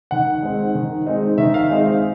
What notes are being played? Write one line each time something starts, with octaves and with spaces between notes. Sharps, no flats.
D#3 F#5
G#3 C4 D#4
D#3
G#3 C4 D#4
D#3 E5
F5
G#3 C4 D#4
F5